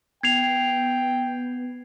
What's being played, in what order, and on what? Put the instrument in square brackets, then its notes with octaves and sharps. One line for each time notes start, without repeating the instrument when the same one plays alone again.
[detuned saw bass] B3 [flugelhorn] G5 [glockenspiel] G#6 C7 F7